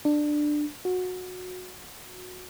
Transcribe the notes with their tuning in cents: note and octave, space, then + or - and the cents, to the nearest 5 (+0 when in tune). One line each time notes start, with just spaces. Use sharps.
D4 +15
F#4 -20